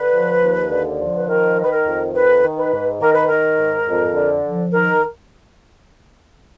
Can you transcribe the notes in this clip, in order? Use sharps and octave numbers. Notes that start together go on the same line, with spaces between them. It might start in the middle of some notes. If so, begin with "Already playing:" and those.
Already playing: D3 B4
F3
D#2
D3
F3
B4
D#3 A#4
D#3
B4
A#4
F2
D#3 B4
D#3
B4
G#2
D#3 A#4
B4
D#3 A#4
G#2
F2
D3
F3
D#3 A#4